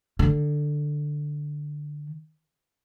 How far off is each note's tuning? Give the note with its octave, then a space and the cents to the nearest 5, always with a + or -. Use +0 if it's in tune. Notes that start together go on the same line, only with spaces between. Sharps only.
D3 +10